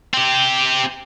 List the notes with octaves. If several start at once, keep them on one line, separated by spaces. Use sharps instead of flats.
C4 G4